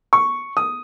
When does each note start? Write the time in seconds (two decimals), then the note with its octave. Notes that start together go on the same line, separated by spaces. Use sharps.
0.13 C#6
0.57 D#6